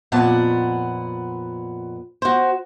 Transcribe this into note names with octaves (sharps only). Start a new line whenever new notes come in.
F2 A#2 B3 F#5 A5
F#4 C5